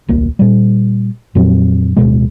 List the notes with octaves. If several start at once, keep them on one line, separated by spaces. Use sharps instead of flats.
D#1 C2 A#3
A#2 G3
F2 A#2 F#3 C4
D1 C2 B2 G#3